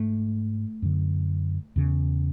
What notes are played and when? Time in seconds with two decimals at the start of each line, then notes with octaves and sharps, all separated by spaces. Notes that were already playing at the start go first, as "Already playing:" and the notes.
Already playing: G#2 A3
0.82 F#2 D3
1.76 E2 C#3